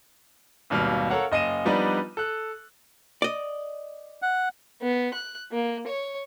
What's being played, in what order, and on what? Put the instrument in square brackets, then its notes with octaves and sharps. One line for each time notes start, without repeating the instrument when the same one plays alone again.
[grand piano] G#1 D#2 B2 G3 F5 F6
A4 A#4 C#5 F5 F#5
F#1 D#5 F5 D#7 E7
F3 G3 B3 D4 D#4 B4
A4 F#6
[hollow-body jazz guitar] D5 D#5
[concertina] F#5
[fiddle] B3
F#6
A#3
C#5